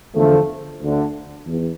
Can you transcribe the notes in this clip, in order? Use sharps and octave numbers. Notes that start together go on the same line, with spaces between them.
E2 D3 F3 A3
D2 D3 A3 D4
E2